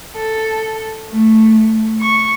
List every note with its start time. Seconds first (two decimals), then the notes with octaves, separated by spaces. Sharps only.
0.15 A4
1.10 A3
2.02 C#6